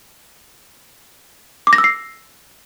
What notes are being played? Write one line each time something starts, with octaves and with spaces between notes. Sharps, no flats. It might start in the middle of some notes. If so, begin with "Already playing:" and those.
D6
A#6
E6
C7